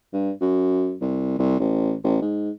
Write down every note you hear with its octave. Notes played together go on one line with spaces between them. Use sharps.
G2
F#2
C2
C2
A1
A1
G#2